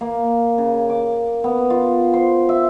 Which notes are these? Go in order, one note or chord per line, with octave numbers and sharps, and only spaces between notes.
A#3
C#3
D6
B3
F4
C5
E5